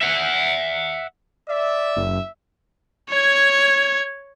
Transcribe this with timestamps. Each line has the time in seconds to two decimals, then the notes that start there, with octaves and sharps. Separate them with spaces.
0.01 E5 F#5
1.49 D5 E5
1.96 F#1
3.09 C#5 G#6